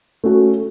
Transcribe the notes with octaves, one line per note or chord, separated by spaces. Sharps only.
A3 C#4 F#4